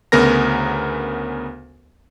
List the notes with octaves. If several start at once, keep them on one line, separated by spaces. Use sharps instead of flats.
D2 C#3 B3 A#4 A#5 A#6